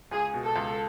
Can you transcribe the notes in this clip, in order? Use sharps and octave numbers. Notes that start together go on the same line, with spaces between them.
C#2 G#4
B2
A4
C#2